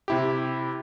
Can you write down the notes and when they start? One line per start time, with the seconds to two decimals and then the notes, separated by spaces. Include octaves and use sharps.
0.08 C3 E4 G4